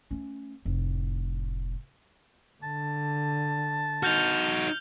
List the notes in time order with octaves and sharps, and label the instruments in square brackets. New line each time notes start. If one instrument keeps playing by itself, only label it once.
[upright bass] A3 C#4
F1 A2
[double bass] D3 [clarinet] A5
[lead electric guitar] D#4 F#4 [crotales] F6 G6 F7